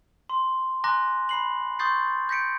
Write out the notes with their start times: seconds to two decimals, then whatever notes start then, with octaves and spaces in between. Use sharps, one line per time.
0.30 C6
0.84 G#5 A#5 C6 D6 F#6 A#6
1.29 B5 C7 F#7
1.79 C6 C#6 D#6 G6 A6 C7
2.29 G6 A#6 B6 C#7 D7